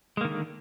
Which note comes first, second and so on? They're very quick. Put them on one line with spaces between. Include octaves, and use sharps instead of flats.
G#3 A#3 D#3 D3